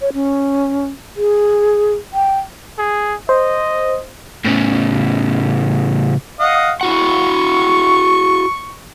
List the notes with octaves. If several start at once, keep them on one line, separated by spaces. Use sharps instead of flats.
C#5
C#4
G#4
G5
G#4
C5 D#5
A2 C#3
D#5 F5 F#5
E4 F#4 F#5 C#6